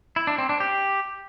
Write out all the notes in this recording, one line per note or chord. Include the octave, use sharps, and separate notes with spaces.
E4
D4
C4
D4
G4